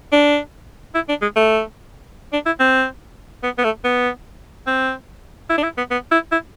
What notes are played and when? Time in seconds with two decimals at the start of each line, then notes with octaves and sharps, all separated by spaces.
0.13 D4
0.95 E4
1.09 D4
1.22 G#3
1.36 A3
2.33 D4
2.46 E4
2.60 C4
3.43 B3
3.58 B3
3.64 A3
3.84 B3
4.67 C4
5.50 E4
5.58 D4
5.63 E4
5.77 B3
5.91 B3
6.12 E4
6.32 E4